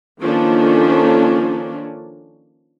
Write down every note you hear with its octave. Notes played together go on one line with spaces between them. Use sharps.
D#3 F3 A#3 C#4 D4 A4